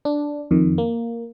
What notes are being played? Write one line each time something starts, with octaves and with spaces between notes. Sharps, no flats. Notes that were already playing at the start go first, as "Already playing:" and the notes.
D4
F2 D#3
A#3